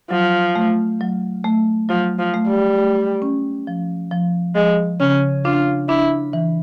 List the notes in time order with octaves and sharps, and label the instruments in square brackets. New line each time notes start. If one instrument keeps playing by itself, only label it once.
[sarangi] F3 [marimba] F#3
[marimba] A3
F#3
A3
[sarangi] F3 [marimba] F#3
[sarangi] F3
[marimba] A3
[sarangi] G3
[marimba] A3
C#4
F3
F3
[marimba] F3 [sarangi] G#3
[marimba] C#3 [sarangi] C#4
[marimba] D4 [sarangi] F4
[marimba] D4 [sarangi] E4
[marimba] E3